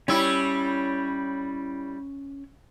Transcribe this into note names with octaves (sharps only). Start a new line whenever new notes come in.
G3 C#4 E4 C#5 E6